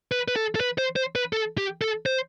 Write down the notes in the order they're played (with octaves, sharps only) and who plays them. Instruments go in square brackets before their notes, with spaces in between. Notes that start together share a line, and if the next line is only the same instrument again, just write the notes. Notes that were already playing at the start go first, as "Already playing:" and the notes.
[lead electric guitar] B4
B4
A4
A4
B4
C5
C5
B4
A4
G4
A4
C5